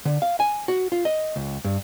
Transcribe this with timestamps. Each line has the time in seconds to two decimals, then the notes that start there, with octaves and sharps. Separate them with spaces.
0.05 D3
0.22 F5
0.40 G#5
0.68 F#4
0.92 F4
1.05 D#5
1.36 C#2
1.64 G2